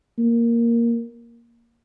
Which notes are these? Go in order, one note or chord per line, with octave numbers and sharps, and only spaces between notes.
A#3